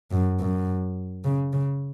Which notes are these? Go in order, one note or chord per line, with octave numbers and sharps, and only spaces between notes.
F#2
F#2
C#3
C#3